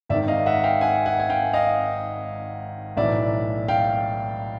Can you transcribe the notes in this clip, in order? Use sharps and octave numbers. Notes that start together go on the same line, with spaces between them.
G#1 G#2 D#3 D5 E5
D#5 F5
E5 F#5
F5 G5
F#5 G#5
F#5 G#5
G#5
F5 G5
D#5 F5
B1 A2 E3 D5 E5
F5 G5